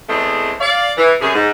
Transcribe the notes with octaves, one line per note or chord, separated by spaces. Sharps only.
E2 G#3 A3 C4
D5 F5
E3
F#2 C3 G#4
G#2